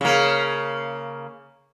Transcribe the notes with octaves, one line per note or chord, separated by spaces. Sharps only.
C#3 A#3